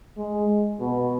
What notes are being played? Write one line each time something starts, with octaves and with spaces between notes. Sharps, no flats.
G#3
B2